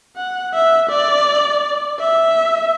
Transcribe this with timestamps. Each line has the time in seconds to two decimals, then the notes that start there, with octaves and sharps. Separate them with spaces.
0.17 F#5
0.54 E5
0.90 D5
2.00 E5